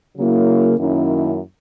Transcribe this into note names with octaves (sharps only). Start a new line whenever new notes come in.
C#3 F#3 A#3 E4
F#2 D#3 A#3 C#4 E4